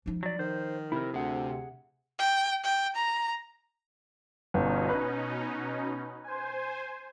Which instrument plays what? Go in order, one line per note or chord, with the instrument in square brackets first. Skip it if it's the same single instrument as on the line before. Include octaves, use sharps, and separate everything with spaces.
[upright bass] F3 D#4
[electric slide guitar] F#3 D5
[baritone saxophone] D#3 [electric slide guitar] C5
[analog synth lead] C3 [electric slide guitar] E4 A#4
[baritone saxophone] D2 [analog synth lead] C3 [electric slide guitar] G#4 F#5
[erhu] G5
G5
A#5
[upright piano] G1 [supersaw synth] B2 C#4 D#4
[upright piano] B4
[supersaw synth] C5 G#5